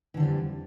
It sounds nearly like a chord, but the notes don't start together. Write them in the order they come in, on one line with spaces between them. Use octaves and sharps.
E3 D3 G3 F2